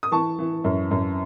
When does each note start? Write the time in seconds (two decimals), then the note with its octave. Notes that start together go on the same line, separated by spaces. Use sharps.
0.03 D#6
0.11 E3 A5 C#6
0.39 E3
0.64 F#2
0.91 F#2